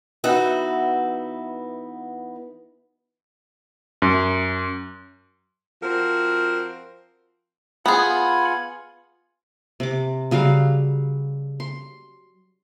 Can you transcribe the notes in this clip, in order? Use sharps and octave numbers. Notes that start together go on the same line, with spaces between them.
E3 B3 D#4 F#4 E5
F#2
F3 C4 F#4 A#4
B3 F4 G#4 F#5 G#5 B5
C3 D6
C#3 F#3 G3 F5
C6